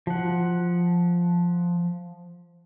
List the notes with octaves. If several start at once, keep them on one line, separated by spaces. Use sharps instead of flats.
F3 F#5